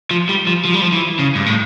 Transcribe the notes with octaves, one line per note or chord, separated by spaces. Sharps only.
F3
G3
F3
F3
G3
F3
E3
C#3
G2
A2